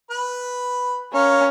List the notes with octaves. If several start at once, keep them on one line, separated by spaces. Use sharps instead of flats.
B4 B5
C#4 A#4 C#5 F5